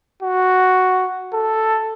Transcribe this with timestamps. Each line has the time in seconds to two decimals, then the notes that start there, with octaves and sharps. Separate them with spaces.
0.23 F#4
1.34 A4